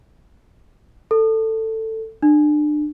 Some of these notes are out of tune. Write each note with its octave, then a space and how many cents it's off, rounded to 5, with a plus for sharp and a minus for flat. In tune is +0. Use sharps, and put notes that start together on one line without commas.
A4 +15
D4 +30